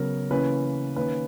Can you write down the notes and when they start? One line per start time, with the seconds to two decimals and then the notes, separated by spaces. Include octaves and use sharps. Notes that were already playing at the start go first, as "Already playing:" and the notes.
Already playing: C#3 F#3 B3 A#4
0.30 C#3 E3 A#3 C#4 B4
0.96 D#3 A#3 C#4 B4